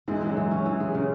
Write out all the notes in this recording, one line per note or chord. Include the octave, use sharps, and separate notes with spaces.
G#2 E3 G#3
E3 G#3
F#2 F#3
E3
C#4
E3
G#4
C#3